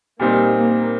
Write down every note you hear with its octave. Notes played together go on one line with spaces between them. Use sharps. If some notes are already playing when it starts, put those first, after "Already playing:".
A#2 G3 A#3 C4 D#4
A#3